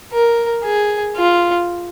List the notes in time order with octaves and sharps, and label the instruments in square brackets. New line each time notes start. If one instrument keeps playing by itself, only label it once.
[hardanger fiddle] A#4
G#4
F4